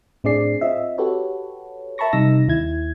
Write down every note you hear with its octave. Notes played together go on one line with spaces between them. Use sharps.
A2 C4 D4 G#4 D5 C7
C4 F4 D#5 E5
F#4 G4 A4 B4 C#5
A#4 E5 A5 B5 C#6 A#6
C3 G3 D#4 E6 A#6
D#2 E4 G#6